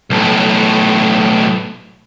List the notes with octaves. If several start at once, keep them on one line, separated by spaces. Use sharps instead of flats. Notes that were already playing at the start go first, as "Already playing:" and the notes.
B1 A2